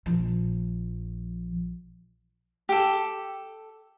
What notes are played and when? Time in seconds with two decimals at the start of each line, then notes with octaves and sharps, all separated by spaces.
0.06 A#1 F3
2.69 G4 A4